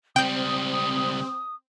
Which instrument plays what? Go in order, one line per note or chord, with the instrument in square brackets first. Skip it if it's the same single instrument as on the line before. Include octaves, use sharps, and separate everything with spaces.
[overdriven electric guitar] C#2 G3 [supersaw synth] C4 [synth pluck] G5 G6 [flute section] D#6